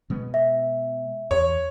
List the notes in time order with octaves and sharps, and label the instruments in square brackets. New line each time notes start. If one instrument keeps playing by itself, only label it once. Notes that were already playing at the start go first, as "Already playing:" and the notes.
[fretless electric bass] B2 G#3 B3
[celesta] E5
[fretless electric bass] E2 [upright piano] C#5